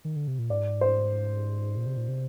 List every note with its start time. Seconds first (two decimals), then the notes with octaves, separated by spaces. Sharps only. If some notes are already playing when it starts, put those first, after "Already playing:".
0.05 D#3
0.16 D3
0.28 C3
0.39 A#2
0.50 G#2 D5
0.81 C5
1.77 A#2
1.86 C3
1.97 A#2
2.08 C3